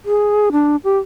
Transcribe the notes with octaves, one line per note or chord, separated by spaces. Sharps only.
G#4
D4
G4